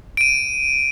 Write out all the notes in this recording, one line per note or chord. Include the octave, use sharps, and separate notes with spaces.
D7 D#7